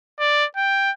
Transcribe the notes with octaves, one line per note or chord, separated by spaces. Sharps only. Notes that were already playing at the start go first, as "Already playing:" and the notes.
D5
G5